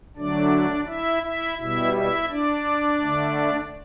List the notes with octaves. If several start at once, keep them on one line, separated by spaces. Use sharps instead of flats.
D3 F#3 A3 D4 D5
E4 E5
E4 E5
B2 G3 E4 E5
E4 E5
D4 D5
D3 A3